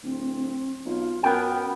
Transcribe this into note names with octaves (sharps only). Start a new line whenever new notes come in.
D1 C4
B1 F4
F#2 B3 A#4 G5